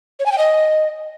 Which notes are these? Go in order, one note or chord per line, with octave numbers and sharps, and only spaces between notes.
C#5
G#5
G5
D#5